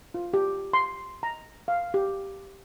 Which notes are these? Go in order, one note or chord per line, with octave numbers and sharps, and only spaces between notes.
F4
G4
C6
A#5
F5
G4